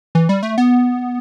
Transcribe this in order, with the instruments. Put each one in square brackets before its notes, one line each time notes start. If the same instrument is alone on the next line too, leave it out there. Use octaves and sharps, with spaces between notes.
[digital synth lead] E3
G3
A3
B3